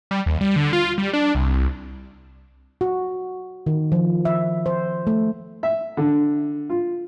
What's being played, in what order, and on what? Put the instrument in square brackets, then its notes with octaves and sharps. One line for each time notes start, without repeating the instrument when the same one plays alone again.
[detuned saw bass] G3
D#2
G3
D3
F4
G3
D4
C2
[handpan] F#4
D#3
F3
E5
C5
A3
[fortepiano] E5
D3
F4